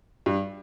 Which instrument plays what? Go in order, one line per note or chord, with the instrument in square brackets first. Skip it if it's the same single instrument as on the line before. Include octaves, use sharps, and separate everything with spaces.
[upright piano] G2